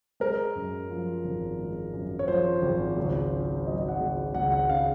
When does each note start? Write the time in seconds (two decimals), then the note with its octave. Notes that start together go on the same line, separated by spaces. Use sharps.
0.20 G#3 A#4
0.55 F#2
0.90 F3
1.25 G#1
1.59 G#3
1.93 F#2
2.19 C#5
2.28 F3 C5
2.62 G#1
2.97 C#2
3.32 C#3
3.65 F#3 D#5
3.88 F#5
4.00 C#2
4.34 C#2 F#5
4.52 F#5
4.69 C#3 F5